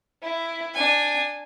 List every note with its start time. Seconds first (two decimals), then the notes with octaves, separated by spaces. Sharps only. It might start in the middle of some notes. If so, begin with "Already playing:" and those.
0.22 E4
0.74 D4 G#5